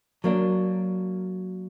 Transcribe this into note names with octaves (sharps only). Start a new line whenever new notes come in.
F#3 A#3 D4